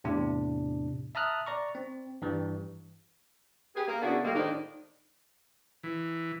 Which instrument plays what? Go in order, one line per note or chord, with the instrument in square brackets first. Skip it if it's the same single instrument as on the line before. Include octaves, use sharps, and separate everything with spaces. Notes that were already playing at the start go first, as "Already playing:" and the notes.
[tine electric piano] E2 A2 C3 D4
E5 A5 A#5 D#6 F6 F#6
D5 A#5 C#6
C4
G2 E3 G3
[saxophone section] G4 G#4 B4
A#3
C#3 B3 D4 E4 F#4 G#4
A2 G3 G#3 A#3
A2 D#3 F3 D4 D#4
[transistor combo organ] E3